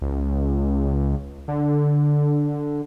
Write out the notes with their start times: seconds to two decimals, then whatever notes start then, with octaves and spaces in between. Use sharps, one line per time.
0.02 C#2
1.48 D3